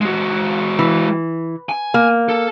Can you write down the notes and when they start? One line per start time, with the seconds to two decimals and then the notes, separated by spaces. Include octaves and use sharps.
0.01 G#3 F#4
0.79 E3
1.69 G#5
1.94 A#3
2.29 A4